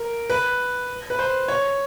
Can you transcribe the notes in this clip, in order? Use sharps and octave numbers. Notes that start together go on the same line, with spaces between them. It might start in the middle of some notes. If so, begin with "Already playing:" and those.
Already playing: A#4
B4
B4
C5
C#5